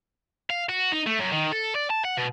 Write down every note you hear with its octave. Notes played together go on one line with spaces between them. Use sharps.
F5
F#4
D#4
A3
F#2
D#3
A4
D5
A5
F#5
B2